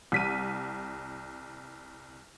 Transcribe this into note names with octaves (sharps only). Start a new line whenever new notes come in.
C2 B6 D#7